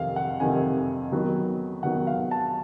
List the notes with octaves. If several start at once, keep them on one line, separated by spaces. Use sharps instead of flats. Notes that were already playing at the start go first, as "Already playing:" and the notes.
Already playing: F2 C3 D#3 F5
F#5
F2 C3 D#3 G#5
D#3 F#3 B3
D#3 F#3 B3 F#5
F5
A5